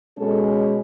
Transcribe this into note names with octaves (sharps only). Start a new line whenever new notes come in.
B2 G#3 C#4 A4